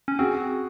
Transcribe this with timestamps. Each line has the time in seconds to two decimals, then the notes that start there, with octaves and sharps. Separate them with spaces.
0.08 C#4
0.19 C4 F#4 G#4